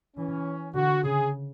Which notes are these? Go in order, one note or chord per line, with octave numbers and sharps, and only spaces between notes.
E3 C#4
D3 F#4
C#3 G#4